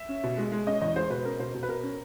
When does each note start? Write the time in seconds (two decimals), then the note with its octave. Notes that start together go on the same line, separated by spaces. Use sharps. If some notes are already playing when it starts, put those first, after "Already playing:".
Already playing: E5
0.09 C#4
0.23 B2
0.38 G#3
0.52 G#3
0.67 C#4 D#5
0.81 E2 D#5
0.96 G#3 C5
1.10 B2 B4
1.25 C#4 A#4
1.39 B2 C5
1.54 B2
1.63 B4
1.68 B2 A#4
1.83 C#4